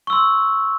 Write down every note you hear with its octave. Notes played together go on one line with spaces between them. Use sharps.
C6 C#6 E6